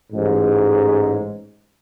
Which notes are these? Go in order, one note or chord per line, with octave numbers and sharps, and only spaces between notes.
A1 G#2